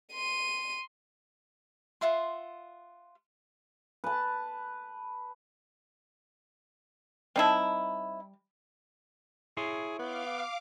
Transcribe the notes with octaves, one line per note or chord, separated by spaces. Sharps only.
C6 D#7
F4 E5 F#5 C6
B4 A5
G3 C4 D#4 E4 A5
E4 G#4 C#5 C6
B3 F5 D6